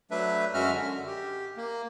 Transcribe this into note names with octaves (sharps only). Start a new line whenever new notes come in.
F#3 A3 D4 B4 E5
F#2 G#3 C#4 F#4 E5 F6
D3
G4
A#3